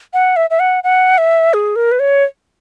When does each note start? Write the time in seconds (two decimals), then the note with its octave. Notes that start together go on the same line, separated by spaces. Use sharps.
0.13 F#5
0.36 E5
0.50 E5
0.60 F#5
0.84 F#5
1.18 E5
1.54 G#4
1.76 A#4
1.92 B4
2.00 C#5